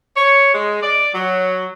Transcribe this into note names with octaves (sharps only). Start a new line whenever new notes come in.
C#5
G#3
D5
F#3